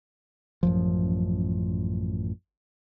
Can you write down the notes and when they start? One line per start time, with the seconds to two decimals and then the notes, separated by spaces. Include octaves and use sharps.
0.63 A1 F#2 F3